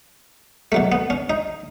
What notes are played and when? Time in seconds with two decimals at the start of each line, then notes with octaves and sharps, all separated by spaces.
0.72 B2 F#3 A3
0.92 B3
1.10 C#4
1.30 D#4